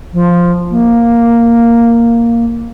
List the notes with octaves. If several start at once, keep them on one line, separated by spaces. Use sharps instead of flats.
F3
A#3